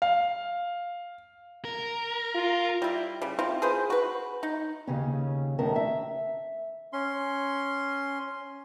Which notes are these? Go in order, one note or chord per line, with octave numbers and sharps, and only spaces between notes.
F5
A#4
F4
G3 E4
C#3 G3
C4 E4 F4
G#4 B4 C5
F#4 B4
D#4
D#2 C#3 C#4
F2 A2 D#3 C#4 A#4 A5
E5
C#4 C6